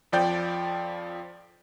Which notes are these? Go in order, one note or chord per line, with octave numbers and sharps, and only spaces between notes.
F2 F3 D5 G5 G6